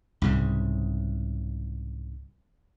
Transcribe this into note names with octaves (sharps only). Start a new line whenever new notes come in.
C2 G#2 C#3